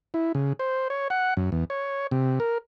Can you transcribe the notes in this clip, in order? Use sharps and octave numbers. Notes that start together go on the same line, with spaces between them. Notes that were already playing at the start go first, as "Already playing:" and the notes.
E4
C#3
C5
C#5
F#5
F#2
E2
C#5
C3
A#4